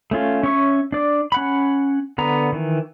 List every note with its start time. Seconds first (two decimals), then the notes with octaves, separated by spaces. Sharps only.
0.11 A3 C#4 F4
0.43 C#4 C#5 E5 C#6
0.92 D4 D5
1.32 C#4 F#5 B5
2.18 D3 B3 A#5
2.52 D#3 E3